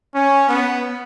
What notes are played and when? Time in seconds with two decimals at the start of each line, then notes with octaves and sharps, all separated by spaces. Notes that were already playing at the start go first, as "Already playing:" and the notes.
0.15 C#4
0.49 B3